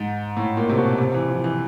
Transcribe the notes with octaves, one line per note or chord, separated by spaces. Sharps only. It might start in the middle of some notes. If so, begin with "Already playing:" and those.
Already playing: G#2
A2
A#2
C3
B2
C3
E3
F3
E3